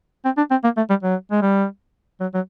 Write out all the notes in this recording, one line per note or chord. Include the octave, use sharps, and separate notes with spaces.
C4
D4
C4
A#3
A3
G3
F#3
G#3
G3
F#3
F#3